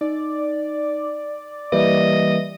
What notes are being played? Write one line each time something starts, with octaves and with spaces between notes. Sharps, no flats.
D#4 D5
E3 G3 A#3 B4 D#5 E5